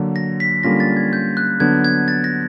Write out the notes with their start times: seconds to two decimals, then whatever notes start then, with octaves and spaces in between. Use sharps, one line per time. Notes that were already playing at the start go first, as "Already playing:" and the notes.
Already playing: D3 F#3 A#3
0.16 A#6
0.40 B6
0.63 D3 G3 A#3 C#4 F4 A#6
0.80 A6
0.97 G#6
1.13 G6
1.37 F#6
1.60 D3 F#3 B3 D4 G#6
1.85 G#6
2.08 A6
2.24 A#6